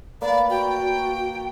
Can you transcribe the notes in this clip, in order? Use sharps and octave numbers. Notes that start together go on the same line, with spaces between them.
A#3 B4 D5
F#4 G5